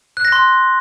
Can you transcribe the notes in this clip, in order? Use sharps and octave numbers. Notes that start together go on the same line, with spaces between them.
F#6
A#6
C6